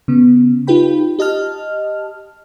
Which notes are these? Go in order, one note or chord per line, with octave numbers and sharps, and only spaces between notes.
C#3 B3
D#4 F4 G4 B4 G5 B5
G4 D#5 A5 F6